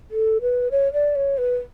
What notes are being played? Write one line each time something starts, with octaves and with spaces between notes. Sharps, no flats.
A4
B4
C#5
D5
C#5
B4